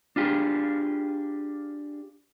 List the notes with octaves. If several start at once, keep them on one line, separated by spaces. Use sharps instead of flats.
D4 F4 G4 G#4